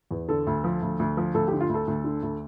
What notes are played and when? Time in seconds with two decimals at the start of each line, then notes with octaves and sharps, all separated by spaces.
0.11 E2
0.28 D3 A4
0.47 D2
0.64 F3
0.82 D2
0.99 D2
1.17 F3
1.34 D2 A4
1.48 D3 G4
1.60 F4
1.69 D2
1.74 A4
1.87 D2
2.04 D3
2.23 D2